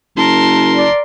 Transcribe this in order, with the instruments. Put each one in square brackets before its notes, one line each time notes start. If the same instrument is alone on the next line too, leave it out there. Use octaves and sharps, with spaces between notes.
[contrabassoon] F#1 [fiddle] A#4 C6 [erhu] A5
[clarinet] D5